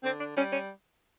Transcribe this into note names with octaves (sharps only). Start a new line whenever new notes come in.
D3 C4
D4
G3 C#4
C#4